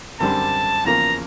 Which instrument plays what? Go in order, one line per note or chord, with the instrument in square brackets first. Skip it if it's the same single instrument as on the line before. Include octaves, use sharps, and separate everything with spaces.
[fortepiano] F#2 D3 G3 C4 [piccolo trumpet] A5
[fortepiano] E2 C#3 F3 A#3 [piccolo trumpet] A#5